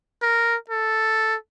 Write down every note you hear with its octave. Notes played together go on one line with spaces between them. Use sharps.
A#4
A4